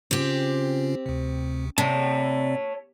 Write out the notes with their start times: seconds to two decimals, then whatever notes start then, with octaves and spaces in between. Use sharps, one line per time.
0.11 C#3 C4 C#4 F4 G4
1.06 D2 C3
1.78 C3 C#5 D5 A5